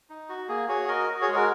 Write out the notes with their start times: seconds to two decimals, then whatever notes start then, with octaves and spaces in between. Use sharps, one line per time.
0.10 D#4
0.29 F#4
0.49 A#3 G#4
0.68 F#4 G#4 C#5
0.88 F#4 A#4 D#5
1.09 F#4
1.21 G#4 C#5
1.28 G#3
1.35 F#4 A#4